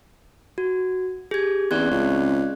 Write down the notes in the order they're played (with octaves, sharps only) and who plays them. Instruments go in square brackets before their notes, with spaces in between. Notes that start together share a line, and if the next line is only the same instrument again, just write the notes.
[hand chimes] F#4
[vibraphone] G4 [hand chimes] G#4 G#6
[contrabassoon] E2 [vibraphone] C4 C#4 [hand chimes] D5 F#6 G#6
[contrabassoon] C#2